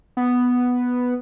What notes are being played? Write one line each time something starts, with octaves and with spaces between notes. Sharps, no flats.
B3